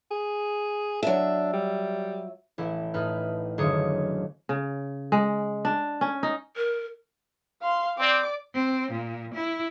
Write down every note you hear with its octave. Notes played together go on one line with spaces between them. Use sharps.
G#4
F#3 D4 E5
G3
A1 E4
A2 D#4 B4 F6
F#1 D3 D#3 C#5 D#6
C#3
G#3
D4
C#4
D#4
A#4
F5 C6
C4 D5 D6
C4
A#2
E4